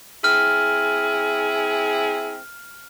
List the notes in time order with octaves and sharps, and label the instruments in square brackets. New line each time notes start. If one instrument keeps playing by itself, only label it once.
[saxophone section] C4 E4 G#4 [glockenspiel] F6